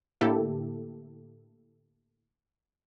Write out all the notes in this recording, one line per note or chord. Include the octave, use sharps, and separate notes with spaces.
A2 D3 A#3 E4 G4 A4